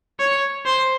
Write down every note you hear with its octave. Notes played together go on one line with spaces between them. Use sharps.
C#5
C5